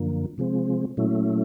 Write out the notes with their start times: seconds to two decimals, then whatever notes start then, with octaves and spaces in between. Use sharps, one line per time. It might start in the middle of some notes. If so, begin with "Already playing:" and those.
Already playing: F#2 D3 F3 A#3
0.38 C3 F3 G#3 C4
0.97 A#2 F#3 A3 C#4 E4